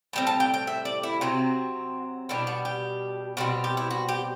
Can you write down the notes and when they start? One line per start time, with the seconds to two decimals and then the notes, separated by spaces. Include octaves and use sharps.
0.13 A2 G3 C4
0.27 A5
0.40 G5
0.54 G5
0.67 E5
0.85 D5
1.03 E4
1.21 C3 F#3 C4 F#4
2.29 B2 G3 D4 E4
2.47 F#4
2.65 G4
3.37 B2 G3 C4 F#4
3.64 G4
3.77 E4
3.91 F#4
4.09 G4